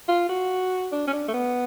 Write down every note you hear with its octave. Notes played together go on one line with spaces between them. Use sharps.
F4
F#4
D4
C#4
D4
A3
B3